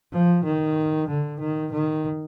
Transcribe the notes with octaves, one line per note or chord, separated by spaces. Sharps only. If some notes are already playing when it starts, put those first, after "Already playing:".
F3
D#3
D3
D#3
D#3